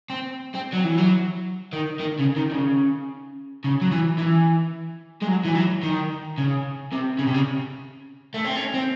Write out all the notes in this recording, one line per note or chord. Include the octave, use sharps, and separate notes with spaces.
C4
C4
F#3
E3
F#3
D#3
D#3
C#3
D#3
D#3
C#3
C#3
F#3
E3
E3
G#3
F#3
E3
F#3
D#3
C#3
C3
C#3
C3
C#3
A3
C4
C#4
C4